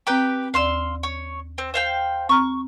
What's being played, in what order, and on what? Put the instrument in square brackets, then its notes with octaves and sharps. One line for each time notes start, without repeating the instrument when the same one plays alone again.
[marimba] C4 A#5 [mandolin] G4 B4 G5
[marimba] D#2 D5 [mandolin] F5 C6 E6
[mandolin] C#5
C4
C5 F5 G5
[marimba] C4 A#5 F6 [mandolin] C#6